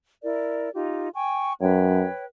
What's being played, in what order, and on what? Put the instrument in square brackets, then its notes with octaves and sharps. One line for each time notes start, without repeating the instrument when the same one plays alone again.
[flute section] E4 A#4 D5
D#4 F4 G4
G5 G#5 C#6
[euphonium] F#2 [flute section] B4 C#5 G5